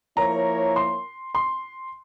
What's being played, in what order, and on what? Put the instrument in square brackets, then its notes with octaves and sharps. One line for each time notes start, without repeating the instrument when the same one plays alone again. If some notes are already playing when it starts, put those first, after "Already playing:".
[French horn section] F3 A#3 E4 A#4 C#5 [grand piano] A#5
[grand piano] C6
C6